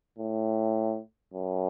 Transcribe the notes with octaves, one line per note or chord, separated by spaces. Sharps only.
A2
F#2